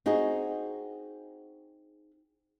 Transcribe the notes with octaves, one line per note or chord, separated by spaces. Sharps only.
C4 D#4 F#4 G#4